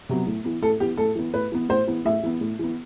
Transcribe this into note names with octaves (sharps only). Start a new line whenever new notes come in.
C3 F#3 B3
A2
E3 B3
A2 A4
E3 B3 G4
A2 A4
E3 B3
A2 B4
E3 B3
A2 C5
E3 B3
A2 E5
E3 B3
A2
E3 B3